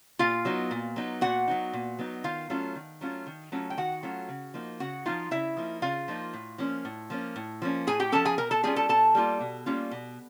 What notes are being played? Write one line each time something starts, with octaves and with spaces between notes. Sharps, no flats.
A#2 F4 F5
F#3 B3 D#4
A#2
F#3 B3 D#4
A#2 F#4 F#5
F#3 B3 D#4
A#2
F#3 B3 D#4
D#3 F4 F5
F#3 A3 C#4 F4
D#3
F#3 A3 C#4 F4
D#3
F#3 A3 C#4 F4
G5
D#3 F#4 F#5
F#3 A3 C#4 F4
C#3
F3 A#3 D#4
C#3 F#4 F#5
F3 A#3 D#4 F4 F5
C#3 E4 E5
F3 A#3 D#4
C#3 F4 F5
F3 A#3 D#4
A2
F3 A#3 C#4
A2
F3 A#3 C#4
A2
F3 A#3 C#4
A2 G#4 G#5
G4 G5
F3 A#3 C#4 A4 A5
G#4 G#5
B2 A#4 A#5
A4 A5
G3 A#3 C#4 F4 G#4 G#5
A4 A5
B2 A4 A5
G3 A#3 C#4 F4
B2
G3 A#3 C#4 F4
B2